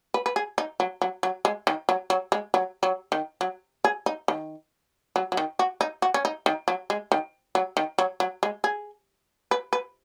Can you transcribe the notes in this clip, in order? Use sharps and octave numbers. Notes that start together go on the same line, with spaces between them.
B4
B4
G#4
D#4
F#3
F#3
F#3
G#3
D#3
F#3
F#3
G#3
F#3
F#3
D#3
F#3
G#4
D#4
D#3
F#3
F#3
D#3
F#4
D#4
F#4
C#4
D#4
D#3
F#3
G#3
D#3
F#3
D#3
F#3
F#3
G#3
G#4
B4
B4